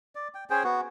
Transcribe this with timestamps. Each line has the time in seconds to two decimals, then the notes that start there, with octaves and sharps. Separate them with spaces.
0.15 D5
0.35 G5
0.50 C#4 G#4 C5 G5
0.64 B3 F#4